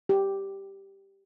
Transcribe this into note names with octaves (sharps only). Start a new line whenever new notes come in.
G4